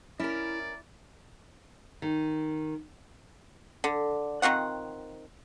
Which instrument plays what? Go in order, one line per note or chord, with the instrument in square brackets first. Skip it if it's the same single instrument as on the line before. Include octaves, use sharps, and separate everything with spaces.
[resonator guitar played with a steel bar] C#4 A#4 [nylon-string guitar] E4 [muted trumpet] D5
[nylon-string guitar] D#3
[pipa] D3
D#3 C4 F4 F#5